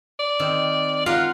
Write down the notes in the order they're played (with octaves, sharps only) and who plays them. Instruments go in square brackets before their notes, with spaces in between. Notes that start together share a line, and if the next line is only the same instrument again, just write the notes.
[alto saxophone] D5
[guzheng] D#3 C4
[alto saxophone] F4 [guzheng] A#4 F5 F#5